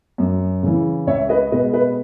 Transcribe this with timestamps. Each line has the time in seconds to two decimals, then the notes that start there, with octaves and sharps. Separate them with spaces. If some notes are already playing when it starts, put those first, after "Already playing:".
0.18 F#2
0.63 C#3 E3
1.07 C#2 C#5 E5
1.29 B4 D#5
1.51 B2 G#3 B4 D#5
1.73 B4 D#5